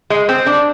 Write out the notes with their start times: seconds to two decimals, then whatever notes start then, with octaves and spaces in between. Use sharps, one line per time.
0.10 G#3
0.29 C4
0.46 D4